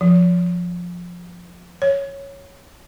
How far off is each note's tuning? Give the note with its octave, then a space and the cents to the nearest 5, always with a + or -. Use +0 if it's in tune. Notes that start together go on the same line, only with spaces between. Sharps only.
F3 +10
C#5 -5